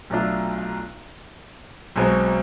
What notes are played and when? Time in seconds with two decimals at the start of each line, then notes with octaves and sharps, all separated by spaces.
0.10 B1 B2 A3 D4 F4
1.96 B1 B2 G#3 C4